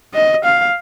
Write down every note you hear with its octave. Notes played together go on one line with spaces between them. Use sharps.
D#5
F5